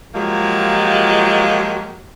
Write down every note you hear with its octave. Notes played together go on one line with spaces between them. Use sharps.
F3 F#3 G#3 A#3 F4 G4